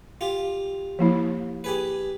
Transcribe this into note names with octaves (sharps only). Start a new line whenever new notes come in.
F4 G4
F3 A#3 E4
G4 G#4 B4